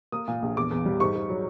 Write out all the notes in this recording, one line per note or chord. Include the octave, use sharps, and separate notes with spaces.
A#3 D#6
A#2
A#1
E2 D6
E2
G3
G#2 C#6
G#2
F#3